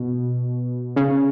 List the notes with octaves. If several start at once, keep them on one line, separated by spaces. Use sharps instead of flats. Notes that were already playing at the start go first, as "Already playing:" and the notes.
Already playing: B2
C#3